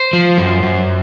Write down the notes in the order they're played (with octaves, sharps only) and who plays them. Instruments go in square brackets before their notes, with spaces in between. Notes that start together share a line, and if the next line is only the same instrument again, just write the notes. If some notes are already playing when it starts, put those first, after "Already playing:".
Already playing: [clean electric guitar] C5
[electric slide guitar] F3
F#2
F#2